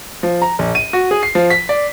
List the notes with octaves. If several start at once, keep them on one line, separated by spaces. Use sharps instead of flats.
F3
A#5
A#1
D#7
F#4
G#4
C7
F3
B6
D5